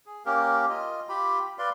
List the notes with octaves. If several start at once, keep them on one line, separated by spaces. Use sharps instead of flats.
G#4
A#3 C#4 G4 A#4
F4 D#5
F4 G4 B5
B4 D5 F5 C6